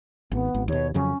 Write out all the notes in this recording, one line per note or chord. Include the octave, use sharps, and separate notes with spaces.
G#1 B3
G#1
D#2 B2 C#5
F2 C#3 F#3 C#4